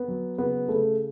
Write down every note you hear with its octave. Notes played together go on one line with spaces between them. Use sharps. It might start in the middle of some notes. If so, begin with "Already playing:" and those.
Already playing: B3
F#3
C#3 B3
C#3 A3